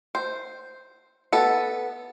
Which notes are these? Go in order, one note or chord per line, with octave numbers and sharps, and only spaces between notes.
C5
B3 A4